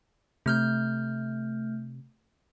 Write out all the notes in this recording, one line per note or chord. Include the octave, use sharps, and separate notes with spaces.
C3 A3 F6 G6